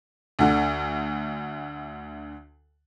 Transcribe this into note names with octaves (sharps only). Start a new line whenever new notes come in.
D2 D3